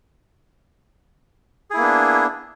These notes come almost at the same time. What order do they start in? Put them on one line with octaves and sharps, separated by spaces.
G#4 E4 A#3 B3 D4